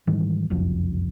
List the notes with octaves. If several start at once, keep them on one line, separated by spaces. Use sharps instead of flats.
G#2 D#3 E3 G3
F#1 C2 F2